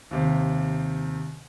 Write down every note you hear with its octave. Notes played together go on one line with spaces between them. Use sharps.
D#2 C3